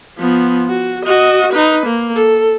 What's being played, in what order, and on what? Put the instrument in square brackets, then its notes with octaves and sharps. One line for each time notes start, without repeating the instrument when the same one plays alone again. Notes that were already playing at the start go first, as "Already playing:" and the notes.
[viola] F3 B3
F#4
F#4 D#5
D#4 B4
A#3
A4